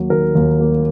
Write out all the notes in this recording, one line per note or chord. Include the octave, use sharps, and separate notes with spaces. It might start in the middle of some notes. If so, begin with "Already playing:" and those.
Already playing: D#2 F#3 A#3
D#3 A#4
D#2
A#3